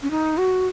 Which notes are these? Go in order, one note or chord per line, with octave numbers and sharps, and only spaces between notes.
C#4
D#4
F#4